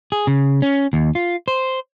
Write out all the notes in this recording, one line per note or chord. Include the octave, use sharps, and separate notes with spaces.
G#4
C#3
C#4
D#2
F4
C5